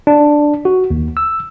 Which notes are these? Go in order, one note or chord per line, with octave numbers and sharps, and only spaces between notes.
D4
F#4
D#2
E6